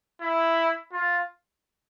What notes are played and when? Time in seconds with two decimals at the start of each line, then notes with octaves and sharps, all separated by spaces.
0.21 E4
0.92 F4